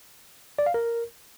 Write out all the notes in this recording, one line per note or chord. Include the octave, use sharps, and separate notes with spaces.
D5
F5
A#4